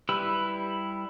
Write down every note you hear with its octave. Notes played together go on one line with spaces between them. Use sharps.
G3 E4 G4 B4 E6